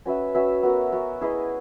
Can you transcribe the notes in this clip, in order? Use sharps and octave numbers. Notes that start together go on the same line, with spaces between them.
C#4 F#4 B4 E5
C#4 F#4 B4 E5
B3 F#4 A#4
B3 F#4 A#4
E4 G#4 B4 D#5